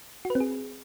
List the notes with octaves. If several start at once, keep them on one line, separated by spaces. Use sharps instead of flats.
F#4
B4
C4
G#4